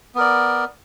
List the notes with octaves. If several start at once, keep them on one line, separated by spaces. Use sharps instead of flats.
B3 A#4 D5